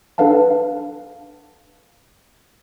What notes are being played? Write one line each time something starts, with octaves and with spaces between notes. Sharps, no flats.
D4 A4 B4 F5 F#5 A5